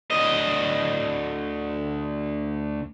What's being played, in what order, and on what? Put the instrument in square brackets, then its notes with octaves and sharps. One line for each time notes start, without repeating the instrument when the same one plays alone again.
[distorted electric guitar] D2 D#5